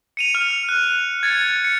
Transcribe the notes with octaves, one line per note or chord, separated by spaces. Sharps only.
C#7 D#7 F7
F6
F#6
G#6 A6 C#7
C#7